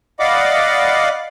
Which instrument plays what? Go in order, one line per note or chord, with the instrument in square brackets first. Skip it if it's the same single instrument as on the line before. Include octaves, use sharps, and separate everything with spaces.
[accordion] D5 D#5 F5 F#5 B5 D6